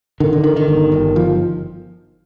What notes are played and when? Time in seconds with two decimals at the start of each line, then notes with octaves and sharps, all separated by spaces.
0.20 D3 D#3
0.33 D3
0.44 D3 D#3
0.56 D#3
0.68 G1
0.92 G1
1.16 F3